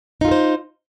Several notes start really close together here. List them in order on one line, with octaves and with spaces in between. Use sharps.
D#4 F4 A4 C5